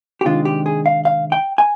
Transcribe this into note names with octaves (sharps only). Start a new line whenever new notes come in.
G4
C3 D#3 G#3 D4 F4
G4
G#4
F5
F5
G5
G#5